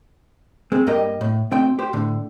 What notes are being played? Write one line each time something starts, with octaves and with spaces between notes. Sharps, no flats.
G#3 C4
G2 G3 A#3 A#4 D#5 G5
A2
B2 A3 C4 G5
G4 C5
A2 D3